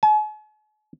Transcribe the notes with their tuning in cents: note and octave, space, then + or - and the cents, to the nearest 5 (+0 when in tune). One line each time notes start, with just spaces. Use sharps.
G#5 +45